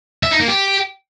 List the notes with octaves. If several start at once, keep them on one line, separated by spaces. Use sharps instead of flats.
E5
D#4
A#3
G4